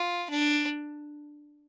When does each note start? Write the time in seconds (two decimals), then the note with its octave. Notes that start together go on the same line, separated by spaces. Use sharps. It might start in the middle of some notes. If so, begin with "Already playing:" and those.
Already playing: F4
0.30 D4